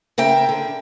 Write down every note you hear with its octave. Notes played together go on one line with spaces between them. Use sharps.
C#3 A#4 E5 G5
D3